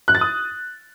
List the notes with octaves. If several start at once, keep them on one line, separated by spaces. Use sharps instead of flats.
F#6
A6
D#6